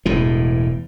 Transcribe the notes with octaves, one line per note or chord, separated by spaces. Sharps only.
E1 A2 E3